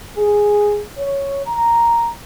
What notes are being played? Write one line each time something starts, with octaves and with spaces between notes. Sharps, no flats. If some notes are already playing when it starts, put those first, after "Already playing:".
G#4
C#5
A#5